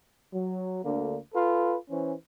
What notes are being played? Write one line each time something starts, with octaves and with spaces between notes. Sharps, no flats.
F#3
D2 D3 A#3
F4 A4 B4
E3 C#4 C5